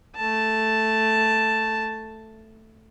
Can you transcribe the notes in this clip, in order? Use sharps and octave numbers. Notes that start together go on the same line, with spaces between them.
A3 A5